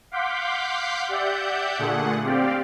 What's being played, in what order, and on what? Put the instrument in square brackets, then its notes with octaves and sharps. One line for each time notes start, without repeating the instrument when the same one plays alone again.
[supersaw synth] F5 F#5 C6 D6 G6 B6
G4 D5 E5 F#5 G6
A#2 D3 A3 G#4 F#5
C4 G4 D5 F5 G5